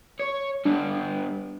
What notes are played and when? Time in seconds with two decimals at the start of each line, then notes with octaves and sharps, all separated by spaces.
0.20 C#5
0.65 G2 B3 D4